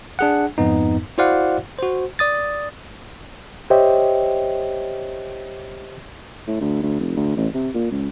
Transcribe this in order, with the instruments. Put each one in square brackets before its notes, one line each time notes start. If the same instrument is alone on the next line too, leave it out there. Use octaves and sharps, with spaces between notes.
[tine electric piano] D4 G#4 F#5
F2 G#2 B3 D#4
E4 F#4 C5 D5 F5 F#5
F#4 C5
D5 D#6 A6
[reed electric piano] G4 C5 C#5 D#5 E5 G5
[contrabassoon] A2
D2
D2
F1
D2
A1
C3
A#2
C#2